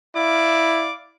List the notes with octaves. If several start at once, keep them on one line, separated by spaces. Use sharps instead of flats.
E4 D5 F5 D6